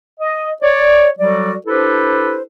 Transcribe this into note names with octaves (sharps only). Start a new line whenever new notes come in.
D#5
C#5 D5
F#3 G3 F#4 A4 D5
D4 E4 G4 A4 B4 C5